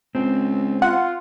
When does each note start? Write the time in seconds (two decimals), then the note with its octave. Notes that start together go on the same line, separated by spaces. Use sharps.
0.15 C#2 C4
0.82 F4 F#5